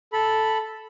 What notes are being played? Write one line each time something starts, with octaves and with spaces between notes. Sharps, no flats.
A4 B5